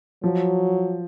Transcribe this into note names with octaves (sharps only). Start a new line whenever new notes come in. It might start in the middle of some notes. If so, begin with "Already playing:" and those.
F3 F#3